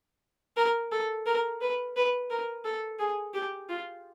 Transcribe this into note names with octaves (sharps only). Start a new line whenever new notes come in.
A#4
A4
A#4
B4
B4
A#4
A4
G#4
G4
F4